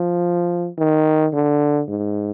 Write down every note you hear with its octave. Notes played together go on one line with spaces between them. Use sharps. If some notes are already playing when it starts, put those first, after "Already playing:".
Already playing: F3
D#3
D3
G#2